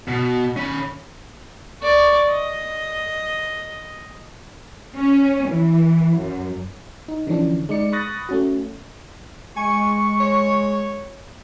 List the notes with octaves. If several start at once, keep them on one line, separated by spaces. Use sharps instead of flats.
B2
C#4 B5
D5 C#6
D#5
C#4
E3
F#2
D#4
D3 E3 F3 C#4 D4
G#3 D#4 D5 C#7
B5 C#6 D#6 F#6 A6 A#6
A3 C#4 F#4
G#3 G#5 C#6
C#5